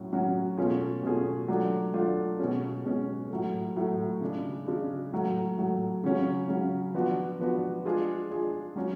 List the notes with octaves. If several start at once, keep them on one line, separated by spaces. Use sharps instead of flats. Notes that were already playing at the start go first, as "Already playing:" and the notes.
Already playing: A2 F#3 C#4
A2 F#3 C#4 F#4
B2 A3 C#4 F4 G#4
B2 A3 C#4 F4 G#4
F#3 A3 D4 F4
F#3 A3 D4 F4
B2 G#3 C#4
B2 G#3 C#4
A2 F#3 A3
A2 F#3 A3
C#3 G#3 D4
C#3 G#3 D4
A2 F#3 A3
A2 F#3 A3
C#3 F#3 C#4
C#3 F#3 C#4
F3 B3 D4 F#4
F3 B3 D4 F#4
G#3 D4 F4 G#4
G#3 D4 F4 G#4
F#3 C#4 F#4